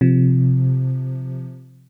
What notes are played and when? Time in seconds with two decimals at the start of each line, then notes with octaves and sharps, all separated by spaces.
0.01 C3 F3